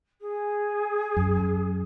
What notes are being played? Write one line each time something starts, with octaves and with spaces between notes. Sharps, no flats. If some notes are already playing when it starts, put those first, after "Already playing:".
G#4
F#2